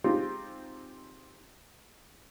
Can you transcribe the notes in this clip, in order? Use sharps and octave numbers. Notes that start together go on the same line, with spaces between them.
G#3 C4 D#4 F4 G4